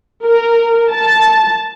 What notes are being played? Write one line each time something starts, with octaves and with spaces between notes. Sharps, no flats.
A#4
A5